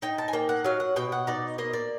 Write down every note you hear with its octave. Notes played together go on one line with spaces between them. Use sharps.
D#4 G5
A5
G#5
A#3 G5
F#5
F#3 F5
F#5
B2 G5
F#5
D#4 D5
A#3 D#5
D5